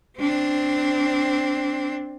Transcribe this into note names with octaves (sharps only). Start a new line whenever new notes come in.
C4 D4